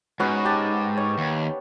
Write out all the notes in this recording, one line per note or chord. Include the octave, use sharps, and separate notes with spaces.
G#2 B3 C#4 F#4
G4 A5
C#5
D#2